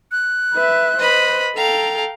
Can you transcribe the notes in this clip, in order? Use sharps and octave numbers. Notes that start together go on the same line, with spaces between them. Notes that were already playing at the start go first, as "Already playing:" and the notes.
F#6
B4 E5
B4 C5 D#5 B5
A4 F5 G5 A#5